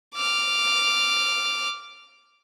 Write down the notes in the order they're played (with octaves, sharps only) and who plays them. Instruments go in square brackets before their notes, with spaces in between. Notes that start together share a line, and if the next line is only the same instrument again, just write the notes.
[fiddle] D6 F6